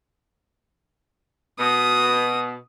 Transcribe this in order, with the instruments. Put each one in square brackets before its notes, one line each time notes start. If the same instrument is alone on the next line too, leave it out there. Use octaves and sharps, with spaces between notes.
[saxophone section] B2 [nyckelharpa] D#6